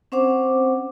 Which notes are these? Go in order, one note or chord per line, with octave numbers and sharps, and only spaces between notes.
C4 C#4 C5 F#5 D6